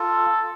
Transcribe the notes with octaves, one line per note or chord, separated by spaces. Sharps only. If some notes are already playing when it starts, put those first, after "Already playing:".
Already playing: F4 A4